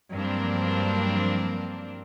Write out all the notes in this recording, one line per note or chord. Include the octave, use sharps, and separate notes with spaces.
G2 F3 F#3 A#3 C4 D4